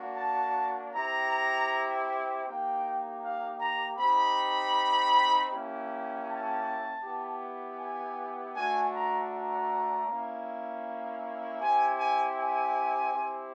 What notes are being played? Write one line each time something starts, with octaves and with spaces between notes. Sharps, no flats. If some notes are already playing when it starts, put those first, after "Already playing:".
Already playing: A#3 D4 F#4
A5
C4 E4 G4 A#5
A#3 D#4 G4 G5
F5
A#5
C4 D#4 G4 B5
A#3 C#4 E4 G4
A5
B3 E4 G4
G#5
A3 D4 F#4 G#5
A#5
A#5
A#3 C#4 E4
C4 E4 G4 G#5
G#5
G#5
C4 E4 G4